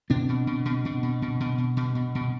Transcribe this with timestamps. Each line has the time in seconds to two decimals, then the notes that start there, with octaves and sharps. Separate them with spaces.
0.10 B2 C4 D4
0.29 B2
0.47 B2
0.65 B2
0.85 B2
1.03 B2
1.22 B2
1.40 B2
1.58 B2
1.77 B2
1.95 B2
2.15 B2